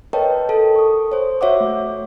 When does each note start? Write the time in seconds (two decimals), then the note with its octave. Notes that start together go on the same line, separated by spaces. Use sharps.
0.13 A#4 B4 C#5 D#5 G5 A5
0.49 A4 A5
0.76 C#6 D#6
1.12 C5 C#5
1.41 F#4 C#5 E5 F#5 D6
1.56 A3 F#4